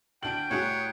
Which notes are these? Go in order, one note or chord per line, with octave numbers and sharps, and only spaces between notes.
D2 D4 G5 D7 F#7
C2 A2 F#4 G#4 C#5 F#6